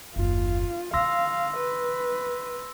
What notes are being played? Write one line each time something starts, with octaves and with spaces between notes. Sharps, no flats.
F#1 D#2 F4
D3 F4 F5 C6 E6 A#6
B4